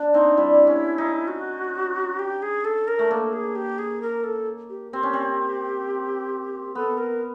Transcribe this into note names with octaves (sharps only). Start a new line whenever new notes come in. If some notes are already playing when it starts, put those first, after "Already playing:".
Already playing: D4
C4 D#4
G3 E4
C#4
D#4
F#4
G4
G#4
A4
A#4
A3
A#3 A4
G#4
G4
G#4
A#4
A4
G4
C4 G4
C#4
C4
B3 A4
A#4